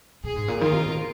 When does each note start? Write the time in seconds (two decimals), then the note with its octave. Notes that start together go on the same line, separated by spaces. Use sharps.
0.24 A#2 G#4
0.36 G#2
0.48 A#2
0.61 D#3 F4 A#4
0.73 C3
0.86 A#2